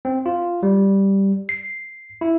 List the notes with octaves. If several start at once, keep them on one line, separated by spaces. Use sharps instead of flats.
C4
F4
G3
C7
E4